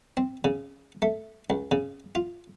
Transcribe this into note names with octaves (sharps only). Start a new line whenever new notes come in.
C4
C#3
A3
C#2
C#3
F4